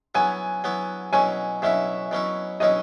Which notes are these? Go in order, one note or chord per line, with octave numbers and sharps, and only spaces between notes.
F#3 B3 E4 G#5
F#3 B3 E4
B2 F#3 C#4 E4 G#5
B2 F#3 C#4 E4 E5
B2 F#3 C#4 E4
B2 F#3 C#4 E4 D#5